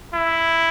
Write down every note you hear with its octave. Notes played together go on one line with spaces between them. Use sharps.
E4